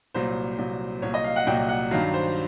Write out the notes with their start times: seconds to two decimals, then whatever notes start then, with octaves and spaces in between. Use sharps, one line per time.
0.14 C2 A#2 F#3 C5
0.58 C2 A#2 F#3
1.02 C2 A#2 F#3 C#5
1.14 D#5
1.24 F5
1.36 F#5
1.47 C2 A#2 F#3 G5
1.69 F#5
1.91 G2 D#3 F#3 F5
2.14 C5